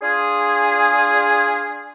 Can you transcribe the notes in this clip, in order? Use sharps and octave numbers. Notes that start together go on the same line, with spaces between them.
D4 F4 G#4